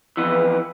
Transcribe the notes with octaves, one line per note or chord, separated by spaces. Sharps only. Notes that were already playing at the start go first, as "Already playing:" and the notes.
F2 E3 B3